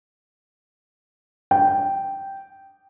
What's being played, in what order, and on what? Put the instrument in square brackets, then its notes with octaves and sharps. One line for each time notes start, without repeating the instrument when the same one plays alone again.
[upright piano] G5